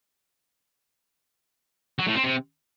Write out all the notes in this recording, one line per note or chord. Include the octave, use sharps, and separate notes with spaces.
F#3
A2
C4
C3